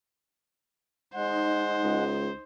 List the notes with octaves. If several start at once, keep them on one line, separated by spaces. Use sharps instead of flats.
G#3 D#4 C5 F#5
C#2